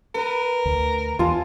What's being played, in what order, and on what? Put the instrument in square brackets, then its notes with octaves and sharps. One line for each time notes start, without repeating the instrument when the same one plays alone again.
[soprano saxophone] A#4 [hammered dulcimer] B4
[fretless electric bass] D2
[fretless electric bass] E2 [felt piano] F4 [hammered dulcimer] G#5 A5 C6